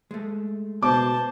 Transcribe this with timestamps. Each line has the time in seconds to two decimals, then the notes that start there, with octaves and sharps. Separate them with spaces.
0.11 G#3 A3
0.83 B2 C5 A5 D6